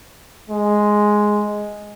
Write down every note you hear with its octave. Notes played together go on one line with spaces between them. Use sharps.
G#3